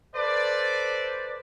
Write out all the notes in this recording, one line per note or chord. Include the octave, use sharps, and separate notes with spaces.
A4 B4 C5 D5